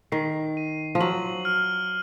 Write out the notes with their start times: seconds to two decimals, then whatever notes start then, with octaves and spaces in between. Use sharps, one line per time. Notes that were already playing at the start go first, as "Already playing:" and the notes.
0.12 D#3 C7
0.57 D#7
0.95 F3
1.00 F#3 F#7
1.45 F6